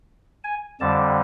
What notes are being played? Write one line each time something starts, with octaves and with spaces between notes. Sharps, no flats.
G#5
F2 D3 G3 A5